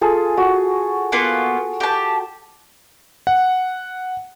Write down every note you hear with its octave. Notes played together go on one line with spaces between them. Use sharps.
F4 G#4 A4
F#4
A#3 B3 F4
G4 A5
F#5